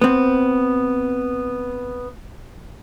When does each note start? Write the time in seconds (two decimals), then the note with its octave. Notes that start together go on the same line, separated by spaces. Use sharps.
0.01 B3 C4